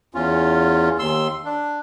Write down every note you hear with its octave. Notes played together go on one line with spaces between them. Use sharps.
E2 C#4 F4
D#2 C6 E6
D4